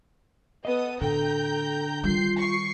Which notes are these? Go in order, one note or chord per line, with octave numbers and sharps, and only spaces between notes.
B3 A4 D#5 D#6
A2 D3 A4 G5 A#5 G6
D#3 G3 F4 G6 C7
C#6 C7